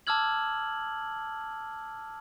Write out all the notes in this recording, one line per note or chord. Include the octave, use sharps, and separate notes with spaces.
A5 D6 E6 F6 G#6 F#7